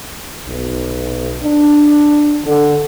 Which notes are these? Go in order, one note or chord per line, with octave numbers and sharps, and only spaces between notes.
B1
D4
D3